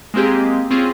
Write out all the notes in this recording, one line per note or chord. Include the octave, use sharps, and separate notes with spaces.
G#3 A#3 C4 G4 G#4
C4 C#4 F4 G#4